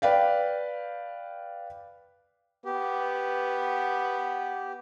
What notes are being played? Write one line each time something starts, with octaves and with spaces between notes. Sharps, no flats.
B4 D5 F5 G5
B3 G4